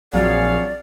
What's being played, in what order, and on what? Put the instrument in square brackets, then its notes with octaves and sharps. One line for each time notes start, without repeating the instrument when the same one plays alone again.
[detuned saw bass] A#1 [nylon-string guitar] F3 F#3 C4 [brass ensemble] G#4 C#5 F5 [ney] D5